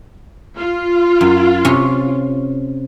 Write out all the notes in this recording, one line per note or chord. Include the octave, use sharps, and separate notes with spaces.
F4
F#2
C3 C#4